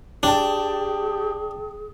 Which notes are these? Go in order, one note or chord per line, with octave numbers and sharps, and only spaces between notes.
D4 G4 G#4 G5 A5